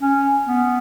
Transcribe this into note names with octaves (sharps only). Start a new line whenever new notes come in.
C#4
B3